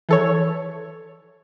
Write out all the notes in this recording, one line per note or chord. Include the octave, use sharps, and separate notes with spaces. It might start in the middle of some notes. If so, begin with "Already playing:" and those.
E3 A4 C#5